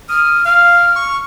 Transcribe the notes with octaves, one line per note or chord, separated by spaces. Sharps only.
D#6 F6
F5 F6
C#6